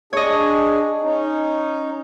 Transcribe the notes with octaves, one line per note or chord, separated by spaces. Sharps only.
D4 G#4 C#5 D#5
C#4 D#4